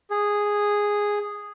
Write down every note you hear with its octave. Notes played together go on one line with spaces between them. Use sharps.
G#4